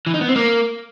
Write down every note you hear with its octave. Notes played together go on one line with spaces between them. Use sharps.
E3
D#4
B3
C4
A#3